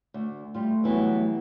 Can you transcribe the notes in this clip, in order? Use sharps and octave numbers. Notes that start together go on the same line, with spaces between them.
D2
G3 A3 F4
B2 E3 F#3 G3 B3 E4